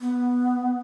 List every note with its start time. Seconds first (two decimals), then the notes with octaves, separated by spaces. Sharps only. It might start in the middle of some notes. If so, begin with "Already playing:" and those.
0.01 B3